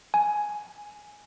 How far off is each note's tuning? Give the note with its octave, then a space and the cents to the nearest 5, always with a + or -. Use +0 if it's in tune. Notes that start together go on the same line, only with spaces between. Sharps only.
G#5 +5